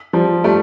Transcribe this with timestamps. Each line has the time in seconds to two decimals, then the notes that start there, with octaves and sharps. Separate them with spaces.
0.13 F3 G3
0.44 G3 A3